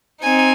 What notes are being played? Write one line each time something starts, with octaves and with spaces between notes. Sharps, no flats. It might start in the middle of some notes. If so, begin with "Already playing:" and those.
C4 D#4 G#5